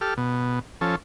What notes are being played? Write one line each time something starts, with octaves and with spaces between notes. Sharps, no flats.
G4 A4 F6
B2
F3 C#4 A4